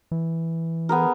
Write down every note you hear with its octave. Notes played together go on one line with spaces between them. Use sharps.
E3
B3 G#4 A#4